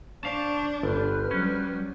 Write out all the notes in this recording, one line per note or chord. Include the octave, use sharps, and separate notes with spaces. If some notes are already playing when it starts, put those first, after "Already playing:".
D4 C5 D5 F5 A5 C#6
G1 B4 C5 F6
F#3 G3 C#4